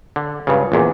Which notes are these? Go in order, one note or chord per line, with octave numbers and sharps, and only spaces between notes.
D3
C#2 G2 C#3
A#1 E2 A#2